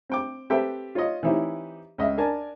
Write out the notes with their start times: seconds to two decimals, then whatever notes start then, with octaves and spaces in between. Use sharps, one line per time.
0.09 C4 G5 D6
0.50 C4 G4 A4 B4 E5 G5
0.95 F4 C#5 D#5
1.23 E3 C4 D#4 E4 G4 C#5
1.98 C#2 D#5 E5
2.18 D4 A#4 G#5 A5